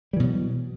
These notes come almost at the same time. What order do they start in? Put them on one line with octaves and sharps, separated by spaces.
G3 E3 B2 F#3